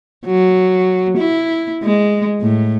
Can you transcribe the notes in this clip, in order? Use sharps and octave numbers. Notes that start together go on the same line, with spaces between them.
F#3
E4
G#3
A2